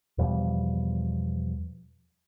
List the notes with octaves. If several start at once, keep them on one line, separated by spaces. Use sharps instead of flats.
E2 B2 F3 G3